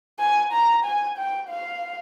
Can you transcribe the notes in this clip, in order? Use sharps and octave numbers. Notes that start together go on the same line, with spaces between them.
G#5
A#5
G#5
G5
F5